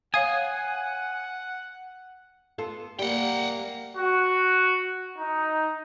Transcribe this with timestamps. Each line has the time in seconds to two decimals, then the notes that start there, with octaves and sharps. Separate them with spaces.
0.14 C#5 F5 F#5 G#5 D#6
2.58 B3 F4 A4
2.99 G3 A#3 F#5 G5
3.97 F#4
5.19 D#4